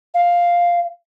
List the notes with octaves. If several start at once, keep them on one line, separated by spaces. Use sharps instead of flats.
F5